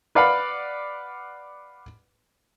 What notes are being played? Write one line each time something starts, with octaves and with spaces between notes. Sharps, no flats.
B4 D5 F5 F#5 B5